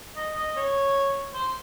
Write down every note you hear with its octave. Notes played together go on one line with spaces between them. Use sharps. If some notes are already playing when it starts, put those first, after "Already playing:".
D#5
D#5
C#5
C5